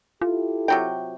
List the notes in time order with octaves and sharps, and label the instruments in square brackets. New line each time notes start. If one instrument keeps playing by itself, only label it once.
[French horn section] E4 G4 A4 [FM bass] F4
[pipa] C3 F#3 G5